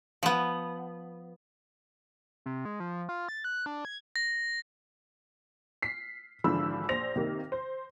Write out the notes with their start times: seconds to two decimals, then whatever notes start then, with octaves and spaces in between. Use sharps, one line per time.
0.23 F3 B3
2.46 C3
2.65 G#3
2.80 F3
3.09 F4
3.29 A6
3.44 F#6
3.66 D4
3.85 G#6
4.16 A#6
5.82 B6 C7
6.44 G#1 D3 E3 F3 B5 E6
6.89 A#1 C5 A#6 F7
7.16 C3 D#3 A#3
7.52 C5